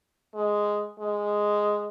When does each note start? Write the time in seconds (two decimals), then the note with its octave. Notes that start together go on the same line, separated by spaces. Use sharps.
0.35 G#3
1.00 G#3